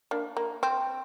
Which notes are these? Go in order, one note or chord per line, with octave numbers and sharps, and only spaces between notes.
A#3 D4
A#3
C4